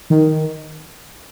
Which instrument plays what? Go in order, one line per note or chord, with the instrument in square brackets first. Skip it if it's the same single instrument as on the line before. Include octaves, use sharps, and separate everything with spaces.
[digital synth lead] D#3